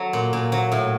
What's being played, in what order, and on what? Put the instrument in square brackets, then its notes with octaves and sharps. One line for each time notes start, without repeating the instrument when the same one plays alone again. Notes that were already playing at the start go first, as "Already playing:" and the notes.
Already playing: [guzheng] F#3 A4
A#2
A#2
F#3
A2